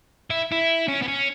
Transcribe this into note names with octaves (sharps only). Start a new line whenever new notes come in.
E4
E4
C#4
B3
C#4